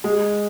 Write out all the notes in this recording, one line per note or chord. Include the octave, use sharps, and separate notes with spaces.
G#3